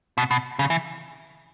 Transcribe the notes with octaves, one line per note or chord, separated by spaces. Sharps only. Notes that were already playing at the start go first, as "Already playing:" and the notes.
B2
B2
C#3
E3